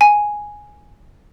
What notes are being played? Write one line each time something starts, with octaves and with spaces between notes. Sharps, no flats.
G#5